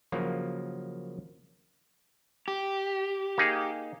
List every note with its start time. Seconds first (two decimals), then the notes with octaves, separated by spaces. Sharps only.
0.12 C#3 F3 F#3 A#3
2.48 G4
3.38 A#3 D#4 G#4